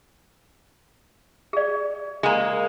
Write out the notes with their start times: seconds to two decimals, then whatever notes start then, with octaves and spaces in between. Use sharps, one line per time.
1.53 G#4 D5
2.23 G#3 A#3